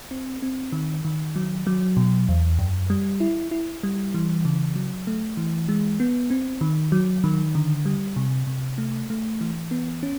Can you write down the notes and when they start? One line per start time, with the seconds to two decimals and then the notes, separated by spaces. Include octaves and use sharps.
0.11 C4
0.42 C4
0.73 D#3
1.05 D#3
1.36 F#3
1.67 F#3
1.97 B2
2.28 E2
2.59 F#2
2.90 G3
3.20 E4
3.51 E4
3.83 G3
4.14 E3
4.45 C#3
4.76 F#3
5.07 A3
5.37 E3
5.69 G#3
6.00 B3
6.30 C4
6.61 D#3
6.92 F#3
7.24 D#3
7.55 D3
7.85 G3
8.16 C3
8.47 C3
8.78 A3
9.10 A3
9.41 E3
9.71 B3
10.03 C#4